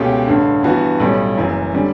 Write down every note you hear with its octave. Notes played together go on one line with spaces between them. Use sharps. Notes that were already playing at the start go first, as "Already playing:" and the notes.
Already playing: C#2 B2 A3 C#4 G4
A1 G2 D3
G2 E3 B3 F#4
B1 A2 G3 C#4
F#1 F#2 E3
D3 G3 C#4